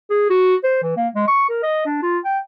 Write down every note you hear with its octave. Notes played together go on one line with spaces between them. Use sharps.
G#4
F#4
C5
E3
A#3
G#3
C#6
A#4
D#5
D4
F4
G5